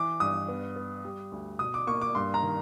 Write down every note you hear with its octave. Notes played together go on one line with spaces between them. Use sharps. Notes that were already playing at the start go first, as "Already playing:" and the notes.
Already playing: E3 D6
G2 D#6
B3
B3
G3
D2
B2 D#6
D6
A#3 C#6
D6
G2 C6
A#5
D#3